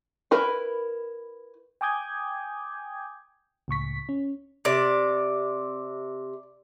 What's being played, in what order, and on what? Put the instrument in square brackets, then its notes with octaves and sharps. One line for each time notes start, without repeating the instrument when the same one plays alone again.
[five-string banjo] E4 A#4 B4
[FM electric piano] G5 G#5 D6 D#6 G6 G#6
C#2 A2 C#6 B6
C#4
[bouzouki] C3 [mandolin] D5